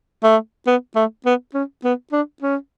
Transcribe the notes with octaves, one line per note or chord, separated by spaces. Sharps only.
A3
B3
A3
B3
C#4
B3
D4
C#4